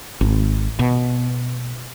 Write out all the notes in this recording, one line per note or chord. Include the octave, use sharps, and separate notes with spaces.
G#1
B2